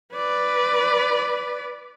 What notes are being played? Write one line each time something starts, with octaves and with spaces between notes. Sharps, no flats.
B4 D5